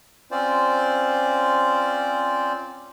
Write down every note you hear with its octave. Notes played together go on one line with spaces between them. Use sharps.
C4 C#4 F4 C5 D5